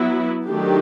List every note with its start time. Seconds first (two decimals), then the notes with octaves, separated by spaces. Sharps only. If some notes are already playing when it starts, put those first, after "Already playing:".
Already playing: F#3 B3 E4
0.46 D#3 F#3 A3 D4 G4